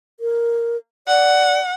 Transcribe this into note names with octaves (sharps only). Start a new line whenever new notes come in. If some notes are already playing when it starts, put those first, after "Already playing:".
A#4
D5 F#5